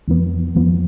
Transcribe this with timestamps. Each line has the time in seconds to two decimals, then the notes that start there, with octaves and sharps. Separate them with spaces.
0.08 F2 F3 B3
0.55 F2 F3 B3